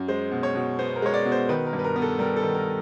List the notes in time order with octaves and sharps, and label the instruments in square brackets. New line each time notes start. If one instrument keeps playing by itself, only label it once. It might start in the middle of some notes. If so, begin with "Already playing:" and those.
Already playing: [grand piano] F#2
G#3 C5
B2
C#5
B2
B3 C5
A#4
G#3 C#5
D5
B2
C5
D#3 B4
A#4
G2
B4
A#4
B3
A4
G3 A#4
A4
D#3
A#4